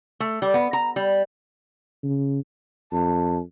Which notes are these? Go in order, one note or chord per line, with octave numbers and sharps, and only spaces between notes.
A3
G3
B3
A#5
G3
C#3
F2 A5